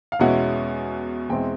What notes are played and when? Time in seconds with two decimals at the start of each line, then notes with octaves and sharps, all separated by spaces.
0.12 F5
0.19 E2 B2 G#3 C#4 E4 F#5
1.29 E2 B2 G#3 C4 E4 G5